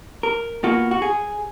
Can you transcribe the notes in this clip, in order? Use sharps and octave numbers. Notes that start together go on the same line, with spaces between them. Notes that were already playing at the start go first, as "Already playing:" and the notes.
A#4
B2 A#3 F4 F#4
F#4
G#4